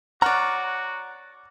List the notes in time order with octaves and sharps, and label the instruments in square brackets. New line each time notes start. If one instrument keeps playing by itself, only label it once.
[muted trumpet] F#4 [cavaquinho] C#5 D5 [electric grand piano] F#5 F6 F#6 [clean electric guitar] A#5